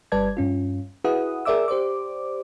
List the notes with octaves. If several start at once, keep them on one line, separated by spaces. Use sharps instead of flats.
G1 G3 B4 D5 A5 G#6
G2 C#4 F4
E4 F#4 G#4 B4 F#5 D#6
G#4 A#4 D5 E5 D6 E6
G4 C5 D5 D6